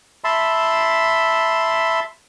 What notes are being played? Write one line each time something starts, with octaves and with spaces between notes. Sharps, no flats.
E5 A5 B5 C6